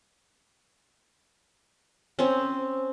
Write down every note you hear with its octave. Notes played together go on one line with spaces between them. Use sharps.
C4 C#4